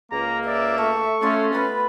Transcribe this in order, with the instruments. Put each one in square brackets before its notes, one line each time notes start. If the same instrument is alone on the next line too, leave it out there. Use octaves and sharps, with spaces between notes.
[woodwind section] C#2 A#3 [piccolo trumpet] A#5
[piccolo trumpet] D5 [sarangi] E5
[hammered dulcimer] A3 [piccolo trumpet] C#6
[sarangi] A3 [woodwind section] C#4 [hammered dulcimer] F4 C6
[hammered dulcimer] B3 F4 [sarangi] B4